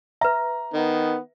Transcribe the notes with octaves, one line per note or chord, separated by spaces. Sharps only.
B4 E5 A#5
D#3 B3